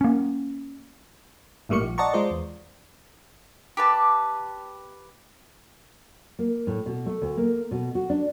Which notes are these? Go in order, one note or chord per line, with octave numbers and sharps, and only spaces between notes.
A#3 C#4
G#1 A2 G3 A#3 C#6 C#7
A#1
D5 D#5 F#5 A5 A#5 C#6
G#3 F4 C5 D5
E2
G4 B4 A5
A#3
A2
B2
A3
D2
A#3
B2
F#4
D4